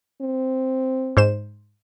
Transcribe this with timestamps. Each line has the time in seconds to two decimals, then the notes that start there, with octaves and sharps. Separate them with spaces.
0.22 C4
1.17 G#2 C5 E7